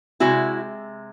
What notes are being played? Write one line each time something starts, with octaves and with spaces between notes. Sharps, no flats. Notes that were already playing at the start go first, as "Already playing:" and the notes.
C3 D#3 G#3 E4 F#4